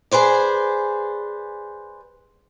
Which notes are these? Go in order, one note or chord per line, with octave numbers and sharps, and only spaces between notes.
G#4 B4 C5 D5